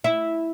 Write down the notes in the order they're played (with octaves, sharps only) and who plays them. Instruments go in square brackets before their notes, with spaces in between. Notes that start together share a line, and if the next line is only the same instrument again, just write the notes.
[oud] E4